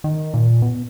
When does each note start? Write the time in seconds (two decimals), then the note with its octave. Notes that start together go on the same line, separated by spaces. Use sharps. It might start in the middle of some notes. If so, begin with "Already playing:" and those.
0.04 D#3
0.34 A#2
0.62 B2